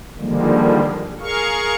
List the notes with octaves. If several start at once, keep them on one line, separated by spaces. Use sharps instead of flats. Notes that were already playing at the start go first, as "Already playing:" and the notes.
D3 D#3 F3 G3 G#3 A#3
G#4 A#4 F5 C#6